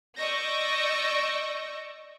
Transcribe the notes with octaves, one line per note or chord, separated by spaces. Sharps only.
D5 D#5 C#6 E6 G6 A#6